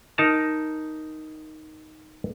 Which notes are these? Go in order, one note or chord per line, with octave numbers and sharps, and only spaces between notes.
D#4 A#4 A5 A#5